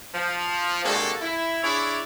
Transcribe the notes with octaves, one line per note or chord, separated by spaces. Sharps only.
F3
C3 G#3 A#3 D4 F#4 A4
E4
D4 E4 G#4 C#5 D5 E5